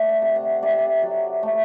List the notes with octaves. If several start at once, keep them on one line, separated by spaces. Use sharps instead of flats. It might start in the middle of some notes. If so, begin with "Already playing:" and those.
Already playing: A3 D5
E5
C3
F#5
C3 D5
E5
D5
F#3
A3